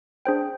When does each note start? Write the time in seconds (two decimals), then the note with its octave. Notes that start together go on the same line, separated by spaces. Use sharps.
0.25 D4 G#4 C5 G5